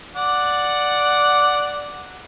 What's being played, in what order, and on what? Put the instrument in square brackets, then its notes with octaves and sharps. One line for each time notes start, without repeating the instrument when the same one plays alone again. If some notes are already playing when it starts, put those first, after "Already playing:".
[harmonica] D5 F#5